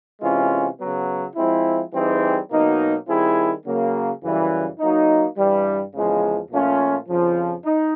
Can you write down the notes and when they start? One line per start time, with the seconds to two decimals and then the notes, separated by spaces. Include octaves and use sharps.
0.21 C3 E3 G#3 C#4 F4
0.78 C#3 F#3 B3
1.35 F3 G#3 C4 E4
1.92 E3 G3 C4 D#4 G#4
2.50 B2 F#3 A#3 D#4
3.07 D#3 G3 C4 E4 G#4
3.64 C#3 F#3 A#3
4.22 F#2 C#3 E3 G3
4.79 F#3 A#3 D#4
5.36 G2 E3 G3
5.93 E2 C#3 F3 G#3
6.51 A#2 F3 A3 C#4 F4
7.08 F2 C#3 F3
7.65 D#4